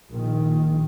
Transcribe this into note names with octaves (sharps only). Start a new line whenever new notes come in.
A#1 D#3